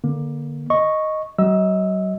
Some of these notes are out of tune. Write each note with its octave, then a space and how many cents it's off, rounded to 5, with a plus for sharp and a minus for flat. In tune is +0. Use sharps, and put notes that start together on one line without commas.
D3 +5 A#3 +25
D#5 +0 C#6 -5
F#3 +40 D#5 +35 E6 +0